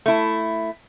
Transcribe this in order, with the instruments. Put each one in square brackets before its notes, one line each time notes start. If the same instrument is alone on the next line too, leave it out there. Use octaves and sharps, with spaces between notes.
[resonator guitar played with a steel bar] A3 E4